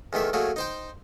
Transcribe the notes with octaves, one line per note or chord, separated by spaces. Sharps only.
E2 D#3 A3 E5
F#3 A3 A#3 G#4
D#4 C5 G5